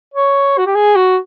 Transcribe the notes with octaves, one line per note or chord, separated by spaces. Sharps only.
C#5
F#4
G4
G#4
F#4